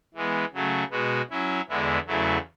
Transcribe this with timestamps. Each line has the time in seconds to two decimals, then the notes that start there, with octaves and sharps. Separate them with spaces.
0.15 E3 G#3 B3
0.53 C#3 F#3 A3
0.91 B2 G#3 B3 F#4
1.30 F#3 C#4 E4
1.69 E2 D3 G#3 B3 E4
2.07 E2 C#3 F#3 A3 E4